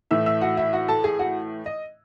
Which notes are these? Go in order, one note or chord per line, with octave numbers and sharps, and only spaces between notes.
A2 E3 A3 E5 E6
E5 E6
F#4 F#5
E4 E5
F#4 F#5
A4 A5
G#4 G#5
F#4 F#5
D#5